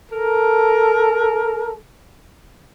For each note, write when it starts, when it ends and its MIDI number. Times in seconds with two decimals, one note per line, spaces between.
0.12 1.73 69
0.12 1.73 70